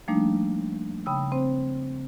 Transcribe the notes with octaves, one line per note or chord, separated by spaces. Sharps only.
F3 G3 A3 A#3 D4 D#4
C#3 G5 B5 D#6 E6
C4 C5